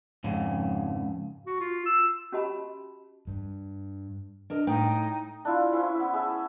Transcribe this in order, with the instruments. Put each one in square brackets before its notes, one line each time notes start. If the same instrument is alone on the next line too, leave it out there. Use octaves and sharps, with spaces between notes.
[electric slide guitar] F2 G#2 C#3
[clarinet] F#4
F4
E6
[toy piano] C#4 F#4 G4 D#5 A5 B5
[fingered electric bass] G2
[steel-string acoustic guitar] D4 A#4 D#5
[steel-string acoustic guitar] A2 G5 [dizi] D#4
[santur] D4 E4 F4
C#4 E4 B4 C5
B3 E5
G#4 E5 A5